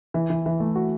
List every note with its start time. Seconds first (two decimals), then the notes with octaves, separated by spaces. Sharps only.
0.14 E3
0.30 E3
0.46 E3
0.60 A3
0.75 F#4